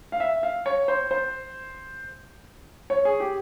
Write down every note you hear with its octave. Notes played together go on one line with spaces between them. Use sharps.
F5
E5
F5
C#5
C5
C5
C#5
G#4
G4